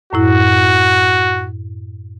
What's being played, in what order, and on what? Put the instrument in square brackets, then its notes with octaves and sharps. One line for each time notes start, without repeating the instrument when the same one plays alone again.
[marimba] F#2 A2 E4 [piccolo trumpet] F#4